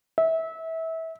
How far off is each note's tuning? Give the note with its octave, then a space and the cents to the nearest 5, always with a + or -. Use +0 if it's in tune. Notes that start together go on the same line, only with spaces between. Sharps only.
E5 -25